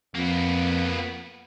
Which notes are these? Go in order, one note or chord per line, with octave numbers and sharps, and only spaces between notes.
F2 A#3 B3